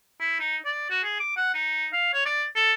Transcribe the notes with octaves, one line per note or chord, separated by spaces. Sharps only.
E4
D#4
D5
F#4
G#4
D6
F#5
D#4
F5
C#5
D5
A4